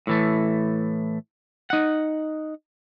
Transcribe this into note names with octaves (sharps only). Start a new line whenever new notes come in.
A2 E3 A3
D#4 F#5